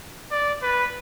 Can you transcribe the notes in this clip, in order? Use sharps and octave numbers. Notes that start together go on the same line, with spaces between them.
D5
B4